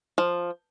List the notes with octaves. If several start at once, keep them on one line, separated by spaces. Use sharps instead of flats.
F3